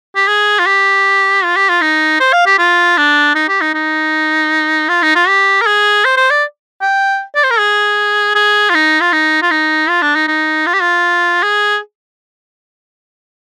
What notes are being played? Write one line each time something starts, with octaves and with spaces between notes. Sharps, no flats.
G4
G#4
F4
G4
F4
G4
F4
D#4
C5
F5
G4
F4
D4
D#4
G4
D#4
D#4
F4
D#4
F4
G4
A#4
G#4
C5
C5
D5
G5
D5
C5
A#4
G#4
G#4
F4
D#4
F4
D#4
F4
D#4
F4
D4
D#4
D#4
F4
G4
F4
G#4